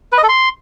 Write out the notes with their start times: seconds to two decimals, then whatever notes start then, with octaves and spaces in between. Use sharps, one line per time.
0.12 B4
0.18 D#5
0.23 A4
0.29 C6